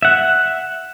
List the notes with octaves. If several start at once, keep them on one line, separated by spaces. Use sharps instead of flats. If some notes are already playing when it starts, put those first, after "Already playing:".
E5 F#5